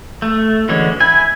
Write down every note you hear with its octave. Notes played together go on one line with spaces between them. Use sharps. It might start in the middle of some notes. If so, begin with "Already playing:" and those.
A3
D3 E3 F#3 G#3 C#4
E4 G#5